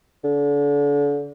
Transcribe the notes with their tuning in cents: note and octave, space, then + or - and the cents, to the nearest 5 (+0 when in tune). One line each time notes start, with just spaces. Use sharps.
D3 -35